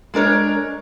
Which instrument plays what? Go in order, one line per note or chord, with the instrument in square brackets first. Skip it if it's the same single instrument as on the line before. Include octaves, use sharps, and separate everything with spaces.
[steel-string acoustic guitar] G#3 D4 A#4 C#5